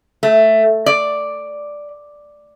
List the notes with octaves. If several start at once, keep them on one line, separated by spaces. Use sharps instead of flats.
A3
D5